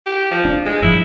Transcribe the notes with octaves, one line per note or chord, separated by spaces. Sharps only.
G4
F3
D4
G#3
G2 F3 E4